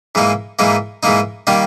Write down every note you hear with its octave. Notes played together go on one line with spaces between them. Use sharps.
G#2 E3 A#3 D#4
G#2 E3 A#3 D#4
G#2 E3 A#3 D#4
D#3 G3 A#3 D#4